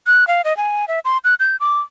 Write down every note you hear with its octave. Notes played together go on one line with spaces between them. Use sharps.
F#6
F5
D#5
G#5
E5
C6
F#6
G6
D6